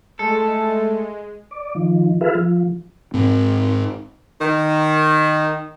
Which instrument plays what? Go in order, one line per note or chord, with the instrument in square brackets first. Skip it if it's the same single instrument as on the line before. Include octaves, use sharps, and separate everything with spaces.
[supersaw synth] G#3 [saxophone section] A3 [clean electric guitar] A4
[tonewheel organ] D5
D#3 F3
F4 G#4 A4 B4 E5 F5
F3
[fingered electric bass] G#2 C4
[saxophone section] D#3